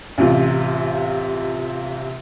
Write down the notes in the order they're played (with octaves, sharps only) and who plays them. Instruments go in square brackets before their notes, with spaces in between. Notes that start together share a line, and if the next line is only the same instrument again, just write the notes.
[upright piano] A1 C3 F4